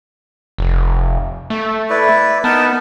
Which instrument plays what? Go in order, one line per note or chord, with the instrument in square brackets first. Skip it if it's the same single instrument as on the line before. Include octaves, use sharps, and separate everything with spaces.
[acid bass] F1
A3
[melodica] E4 B4 D5
[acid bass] B3 [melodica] D#4 A#4 A5